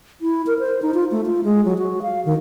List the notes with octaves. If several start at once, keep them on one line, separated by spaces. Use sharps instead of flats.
E4
A#4
C5
D#4
F4
A3
F4
G#3
F#3
F#4
F5
D#3